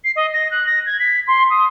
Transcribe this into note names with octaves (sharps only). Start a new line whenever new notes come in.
C7
D#5
A#6
F#6
A#6
G#6
B6
C6
D#6